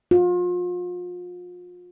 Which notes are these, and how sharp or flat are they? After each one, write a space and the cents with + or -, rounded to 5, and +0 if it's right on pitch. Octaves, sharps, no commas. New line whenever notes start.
F4 +35